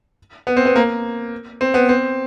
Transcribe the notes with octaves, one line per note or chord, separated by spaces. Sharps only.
B3
C4
B3
A#3
C4
B3
C4